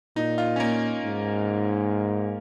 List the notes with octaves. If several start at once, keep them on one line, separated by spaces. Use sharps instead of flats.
A#2 D#4
F4
C#4
A#3
G#2